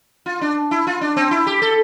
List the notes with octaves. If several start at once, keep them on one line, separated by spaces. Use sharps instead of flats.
F4
D4
E4
F4
D4
C4
E4
G4
A4